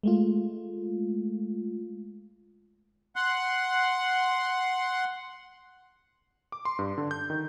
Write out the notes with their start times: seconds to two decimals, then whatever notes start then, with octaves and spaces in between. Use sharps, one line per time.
0.03 G#3 A3 F4
3.16 F#5 C6 F#6
6.52 D6
6.65 C6
6.79 G2
6.98 D3
7.11 G6
7.30 D#3